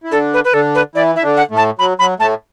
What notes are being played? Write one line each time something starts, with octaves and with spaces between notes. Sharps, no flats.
E4
D3 D4 A4
B4
B4
D3 D4 A4
B4
E3 E4 D5
E4 E5
D3 D4
F#5
A2 A3
A5
F#3 B5
F#3 B5
A2 A3 A5